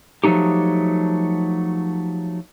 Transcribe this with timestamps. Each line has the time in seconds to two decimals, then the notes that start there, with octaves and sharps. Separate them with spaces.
0.23 F3 F#3 A3 D#4 G4